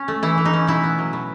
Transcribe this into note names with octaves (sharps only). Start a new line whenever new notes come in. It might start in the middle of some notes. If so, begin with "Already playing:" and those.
Already playing: C#4
A3
E3 E4
E3
D#4
C#4
B2 E4
B3
F#3
B2